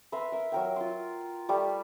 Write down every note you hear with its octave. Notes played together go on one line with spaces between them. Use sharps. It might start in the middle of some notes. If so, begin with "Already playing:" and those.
B4 E5 A#5 C6
A#4 E5
F#3 A#4 G5
F4 C6
G3 A3 G4